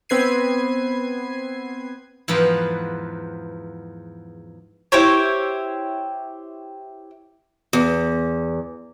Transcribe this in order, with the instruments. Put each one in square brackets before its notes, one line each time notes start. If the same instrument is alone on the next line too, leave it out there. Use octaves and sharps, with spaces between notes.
[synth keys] B3 C4 B4 G#6 C7 D#7
[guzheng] E2 G#2 F3 B3 F4 B4
[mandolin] E4 G4 C5 C#5
[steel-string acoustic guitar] E2